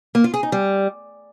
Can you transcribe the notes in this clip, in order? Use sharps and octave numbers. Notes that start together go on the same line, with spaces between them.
A#3
F4
G#4
D#4
G3